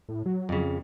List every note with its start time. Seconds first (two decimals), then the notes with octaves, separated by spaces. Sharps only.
0.09 A2
0.26 F#3
0.49 F2 C#3